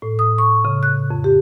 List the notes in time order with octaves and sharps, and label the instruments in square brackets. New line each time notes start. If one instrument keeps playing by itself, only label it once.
[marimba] A2
D#6
C#6
C#3
F#6
F2
G4